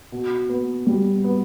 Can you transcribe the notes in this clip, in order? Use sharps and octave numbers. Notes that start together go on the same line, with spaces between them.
B2
B3
G3
B3